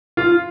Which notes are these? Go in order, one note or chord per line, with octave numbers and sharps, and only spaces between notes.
F4